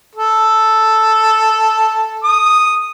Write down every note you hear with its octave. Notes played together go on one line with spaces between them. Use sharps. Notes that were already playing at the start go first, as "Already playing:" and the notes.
A4
D#6